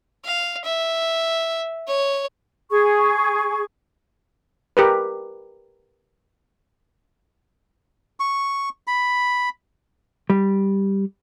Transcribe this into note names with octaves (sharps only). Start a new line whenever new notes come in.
F5
E5
C#5
G#4 C#6
G4 A#4 B4
C#6
B5
G3